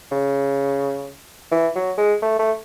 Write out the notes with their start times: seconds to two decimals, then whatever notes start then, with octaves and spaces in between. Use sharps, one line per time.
0.11 C#3
1.51 E3
1.75 F#3
1.98 G#3
2.22 A3
2.39 A3